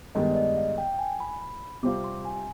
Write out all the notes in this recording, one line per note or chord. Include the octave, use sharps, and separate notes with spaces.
G2 D#3 G#3 B3 D#5
D5
D#5
F5
G5
G#5
B5
B5
C3 G3 C4 F4 D6
C6
G#5